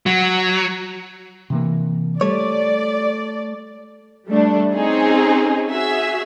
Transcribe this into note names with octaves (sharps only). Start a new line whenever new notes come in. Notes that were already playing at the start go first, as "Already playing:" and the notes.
F#3
C3 E3 A#3
G3 A3 C#5 D5
G3 A3 D4
C4 C#4 D#4 G#4
F#4 G#4 E5 E6